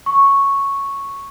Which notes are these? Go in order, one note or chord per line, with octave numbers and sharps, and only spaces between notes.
C#6